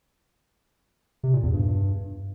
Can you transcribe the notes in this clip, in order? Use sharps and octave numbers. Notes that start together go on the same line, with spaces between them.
C3
A#2
E2
G2